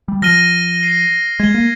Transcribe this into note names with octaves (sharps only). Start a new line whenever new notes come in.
G3
F3 F6 A#6 D#7 G7
F6 C7 D#7
G#3 G#6 D#7 G7
A#3